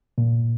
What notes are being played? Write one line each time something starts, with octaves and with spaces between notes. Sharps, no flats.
A#2